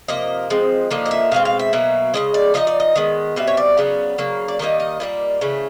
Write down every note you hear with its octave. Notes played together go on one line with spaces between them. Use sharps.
C3 F3 A#3 D#5
F3 G#3 C4
D3 F3 A#3 D#4
D#5
E5
B2 G#3 C4 F5
F5
E5
B2 F#3 A#3
C#3 E3 G#3 D#5
D5
F3 A#3 D#4 D#5
D5
D#5
D#3 G#3 B3
B2 G3 C4 E5
C#5
D5
C#3 F#3 B3
C#3 F#3 A#3
D5
D#3 G3 A#3 D#4 D#5
D#5
A#2 G3 A#3
C#3 E3 A3